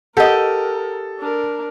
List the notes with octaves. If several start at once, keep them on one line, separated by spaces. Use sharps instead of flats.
G4 A4 A#4 D#5 F#5
D4 A#4